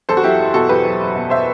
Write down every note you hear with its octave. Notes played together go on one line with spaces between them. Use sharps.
E2 A4 C5
F#4
F#3 E4 G4
F#1
B2 F#4 A4
E2 G4 B4
F#3
F#1
B2
C5 E5